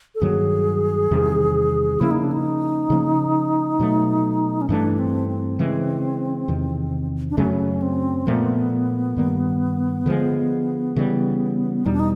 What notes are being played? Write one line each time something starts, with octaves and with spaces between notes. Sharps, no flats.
A4
G2 D#3 F#3 A#3 G#4
E2 C3 D#3 G3
C#3 F3 A#3 C#4 E4
D#4
D4
D#4
C#3 F3 A#3 C#4
B2 F#3 A3
C#4
G2 E3 A3 D4
C4
C4
C#3 E3 G#3
E2 C3 D#3
D4
F#2 C#3 F#3 A3 C#4
C4
A#2 F3 A3 B3
G2 D#3 G3 A#3
D3 F3 G#3
C#3 E3 G3
E2 B2 G3 D#4
D4
D#4